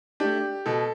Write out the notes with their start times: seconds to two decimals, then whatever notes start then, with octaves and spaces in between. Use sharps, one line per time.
0.20 A3 D4 G4
0.66 B2 A4